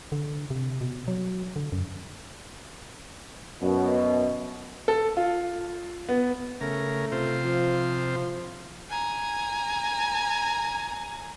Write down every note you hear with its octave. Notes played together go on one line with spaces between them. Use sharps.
D3
C3
B2
F#3
D3
F#2
F#2 B2
A4
F4
B3
C#3 A3 A#4
C3 F4 C5
F3
G#5 A#5